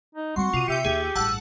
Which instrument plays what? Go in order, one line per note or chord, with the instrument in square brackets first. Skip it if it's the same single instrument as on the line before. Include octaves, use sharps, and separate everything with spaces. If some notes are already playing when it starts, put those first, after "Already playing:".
[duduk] D#4
[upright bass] G3 C4 [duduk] F#4 [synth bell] C6 C#6
[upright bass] C3 [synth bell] F4 D#7 [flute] D6
[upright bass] C3 [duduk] G4 [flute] E5 [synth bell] G5 E6 C#7
[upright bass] D#2 [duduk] G4 [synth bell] G#4
[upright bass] A1 G2 [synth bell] F#5 A5 [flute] E6